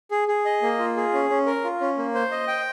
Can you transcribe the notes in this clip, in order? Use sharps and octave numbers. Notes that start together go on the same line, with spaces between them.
G#4
G#4
D#5
A#3
F4
G#4
C#4
C#4
A#4
F4
C#4
A#3
C5
D#5
G5